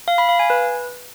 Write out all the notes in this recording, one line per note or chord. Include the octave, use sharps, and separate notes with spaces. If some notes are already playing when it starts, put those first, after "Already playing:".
F5
B5
F5
G#5
B4